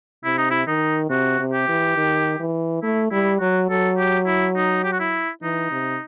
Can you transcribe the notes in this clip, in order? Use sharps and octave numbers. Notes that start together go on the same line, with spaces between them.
C3 E4
D#4
E4
D#3 D#4
C3 F#4
C3
G4
E3
D#3
E3
A3 E4
G3 E4
F#3 F#4
F#3 A4
G4
E4
D#4
G4
F#4
E4
E3 D#4
C3